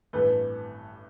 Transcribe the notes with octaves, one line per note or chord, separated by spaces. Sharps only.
A1 G2 E3 A3 B4